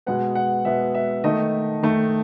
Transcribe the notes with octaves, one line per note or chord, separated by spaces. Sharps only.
B2 G#3 B3 F#5
F#5
B2 G#3 B3 E5
E5
D#3 A3 D#5
D#3 A3